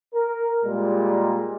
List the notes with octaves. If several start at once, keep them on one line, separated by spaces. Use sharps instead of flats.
A#4
A#2 G3 G#3